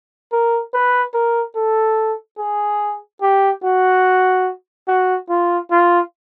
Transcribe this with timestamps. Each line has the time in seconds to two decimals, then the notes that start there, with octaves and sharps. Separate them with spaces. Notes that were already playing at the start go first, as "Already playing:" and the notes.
0.32 A#4
0.74 B4
1.14 A#4
1.56 A4
2.38 G#4
3.22 G4
3.64 F#4
4.88 F#4
5.29 F4
5.71 F4